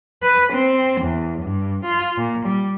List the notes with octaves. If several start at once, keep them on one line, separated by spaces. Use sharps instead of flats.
B4
C4
E2
G2
F4
A#2
G3